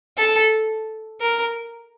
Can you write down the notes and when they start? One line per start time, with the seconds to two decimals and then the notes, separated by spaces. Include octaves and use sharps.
0.18 A4
1.21 A#4